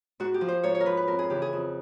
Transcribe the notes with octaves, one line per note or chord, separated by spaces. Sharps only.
G#2 F#4
G4
F3
C5
G#2 C#5
C#5
A#4
F3 B4
B4
F2 A#4
G#4
C#3 E3 G4
G#4
F2